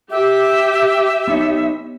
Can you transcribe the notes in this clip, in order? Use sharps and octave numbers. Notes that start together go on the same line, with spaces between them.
G4 E5
B3 D#4 C#5